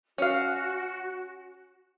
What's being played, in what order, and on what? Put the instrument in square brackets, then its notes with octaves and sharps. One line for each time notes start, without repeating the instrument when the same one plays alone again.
[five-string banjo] C#4 F5 [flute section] F#4